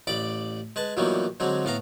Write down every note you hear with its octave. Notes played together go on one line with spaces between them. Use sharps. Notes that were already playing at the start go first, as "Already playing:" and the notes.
A1 D5 B5 D6
G#3 B4 A5
A#2 D#3 E3 F#3 G3 B3
D3 F#3 G#3 C4
A2 B3 F5 A#5